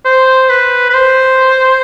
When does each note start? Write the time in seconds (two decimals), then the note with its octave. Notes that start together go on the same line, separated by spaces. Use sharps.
0.05 C5
0.50 B4
0.90 B4
0.94 C5